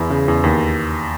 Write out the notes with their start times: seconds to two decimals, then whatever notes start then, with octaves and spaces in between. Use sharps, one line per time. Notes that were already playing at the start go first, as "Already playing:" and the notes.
Already playing: E2 E4
0.10 C#3
0.28 E2
0.44 D#2